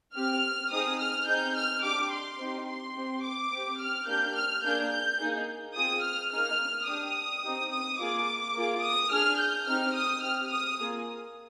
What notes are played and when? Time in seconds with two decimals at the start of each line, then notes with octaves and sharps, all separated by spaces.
0.15 C4 G4 F6
0.71 C4 D#4 G#4 D#6
0.99 F6
1.27 C4 D#4 G#4 G6
1.56 F6
1.83 D4 G4 D6
2.11 C6
2.39 C4 D#4 G4
2.67 C6
2.96 C4 G4
3.23 D6
3.51 C4 G4
3.80 F6
4.07 A#3 D4 G4 G6
4.35 F6
4.63 A#3 D4 G#4 G6
4.91 G6
5.19 A#3 D#4 G#4
5.75 C4 F4 G#4 D#6
6.03 F6
6.32 A#3 D#4 G#4 F6
6.88 D4 G4 D#6
7.43 C4 D#4 G4
7.71 D#6
8.00 A#3 F4 G#4 D6
8.55 A#3 F4 G#4
8.83 D#6
9.12 D4 G#4 F6
9.39 G6
9.67 C4 D#4 G4 F6
9.95 D#6
10.23 C4 G4 F6
10.51 D#6
10.80 A#3 F4 G#4